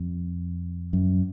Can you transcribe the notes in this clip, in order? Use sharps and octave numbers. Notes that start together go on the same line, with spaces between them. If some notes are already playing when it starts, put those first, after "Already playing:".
Already playing: F2
F#2